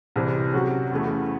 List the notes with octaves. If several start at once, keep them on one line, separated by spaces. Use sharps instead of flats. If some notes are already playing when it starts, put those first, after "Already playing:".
C2 C3 E3 C4
C3 F#3 C#4 F#4
E2 C#3 E3 A3